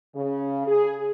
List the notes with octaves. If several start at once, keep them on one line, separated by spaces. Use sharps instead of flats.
C#3
G#4